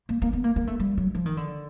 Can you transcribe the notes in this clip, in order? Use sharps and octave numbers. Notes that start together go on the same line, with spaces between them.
A#3
A#3
B3
A#3
A#3
A3
G3
F#3
F3
D#3
D3